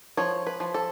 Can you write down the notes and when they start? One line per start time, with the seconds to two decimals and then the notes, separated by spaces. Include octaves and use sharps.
0.17 F3 C#5
0.47 B4
0.60 F3
0.74 A4